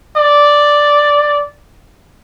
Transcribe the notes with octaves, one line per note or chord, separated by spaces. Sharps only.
D5